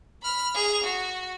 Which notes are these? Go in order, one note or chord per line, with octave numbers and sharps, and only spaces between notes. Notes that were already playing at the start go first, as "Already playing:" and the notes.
B5 F6
G#4 F7
F#4